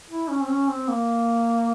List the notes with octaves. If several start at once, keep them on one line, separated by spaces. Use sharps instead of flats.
E4
C#4
C4
C#4
C4
A#3